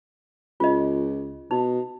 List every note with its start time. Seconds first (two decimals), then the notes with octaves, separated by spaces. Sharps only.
0.60 C#2 F4 D#5
1.51 B2 D#4